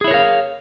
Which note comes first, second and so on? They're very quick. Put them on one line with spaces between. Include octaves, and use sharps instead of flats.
G#4 E4 C#5 A#4 F5